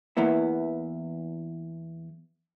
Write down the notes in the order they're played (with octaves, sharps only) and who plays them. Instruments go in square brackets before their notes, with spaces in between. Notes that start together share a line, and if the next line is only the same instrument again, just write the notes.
[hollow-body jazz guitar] E2 E3 A#3 B3 E4